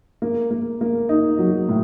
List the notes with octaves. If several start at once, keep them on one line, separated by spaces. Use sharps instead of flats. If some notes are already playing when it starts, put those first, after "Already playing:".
A#3
A#3
A#3
D#4
F#3
A2